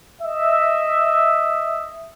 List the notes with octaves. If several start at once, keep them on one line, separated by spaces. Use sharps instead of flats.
D#5 E5